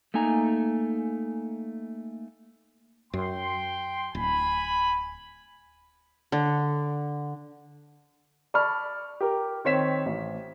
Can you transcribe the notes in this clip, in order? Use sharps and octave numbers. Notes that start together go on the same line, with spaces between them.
A3 A#3 D#4 G#5 A#5
F#2 G5 C6
D1 G#5 B5
D3
D5 A5 B5 C#6 F6
G4 A#4
D#3 C4 C#5 B6 E7
A1